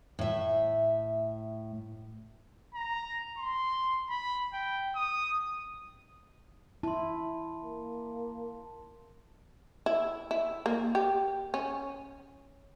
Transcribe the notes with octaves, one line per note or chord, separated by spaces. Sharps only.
A2 E5
A#5
C6
B5
G5
D#6
E4 A5 C6
A#3
E4
E4
A#3
G4
C#4